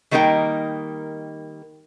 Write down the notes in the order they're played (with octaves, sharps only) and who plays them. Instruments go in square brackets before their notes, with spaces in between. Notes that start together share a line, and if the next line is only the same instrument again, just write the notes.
[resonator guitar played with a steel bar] D#3 G3 A#3 D#4 A#4 G5